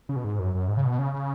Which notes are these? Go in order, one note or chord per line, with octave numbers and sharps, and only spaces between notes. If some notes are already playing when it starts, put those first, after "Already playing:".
C#3
B2
G#2
F#2
F#2
G#2
C#3
B2
C#3
C#3